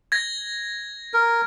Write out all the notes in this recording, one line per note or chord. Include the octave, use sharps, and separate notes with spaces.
G#6 A#6
A#4